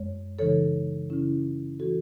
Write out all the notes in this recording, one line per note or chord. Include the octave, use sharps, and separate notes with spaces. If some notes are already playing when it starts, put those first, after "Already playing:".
Already playing: F#2 G#3 C#5
C#3 E3 G#3 D#4 A4 C#5
C#3 G#3 C#4 E4
E3 A3 F#4 A4